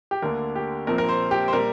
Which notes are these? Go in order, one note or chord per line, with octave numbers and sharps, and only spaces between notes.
G4
D2 D3 A#3 D4 A#4
G4
A#1 A#2 F3 C4 A#4
A#4
C5
G4
C5
A#2 G3 A#4